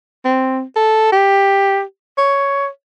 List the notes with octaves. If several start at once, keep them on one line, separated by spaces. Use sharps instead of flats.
C4
A4
G4
C#5